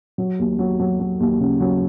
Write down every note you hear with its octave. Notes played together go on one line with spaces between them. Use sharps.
F#3
D#2
F#3
F#3
F#3
D#2
C#3
F#3